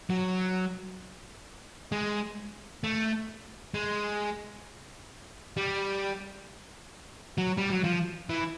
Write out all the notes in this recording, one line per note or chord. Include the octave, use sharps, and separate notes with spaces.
F#3
G#3
A3
G#3
G3
F#3
G3
F#3
F3
E3